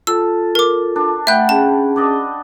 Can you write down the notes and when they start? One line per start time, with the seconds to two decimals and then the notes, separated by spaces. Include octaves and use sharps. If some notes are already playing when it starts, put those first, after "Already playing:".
0.07 F4 A4 A5 E6
0.55 A#4 D6
0.96 D4
1.27 A3 E5 F#5 G5 B5 F#6
1.49 C#4 G#4 A5
1.96 D4 D5 D#5